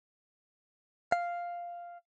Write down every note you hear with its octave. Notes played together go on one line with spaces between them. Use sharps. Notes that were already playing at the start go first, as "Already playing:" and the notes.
F5